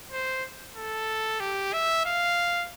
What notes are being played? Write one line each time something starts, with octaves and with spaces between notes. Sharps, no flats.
C5
A4
G4
E5
F5